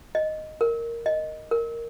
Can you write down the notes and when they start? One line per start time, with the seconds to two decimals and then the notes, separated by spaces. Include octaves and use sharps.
0.15 D#5
0.61 A#4
1.06 D#5
1.51 A#4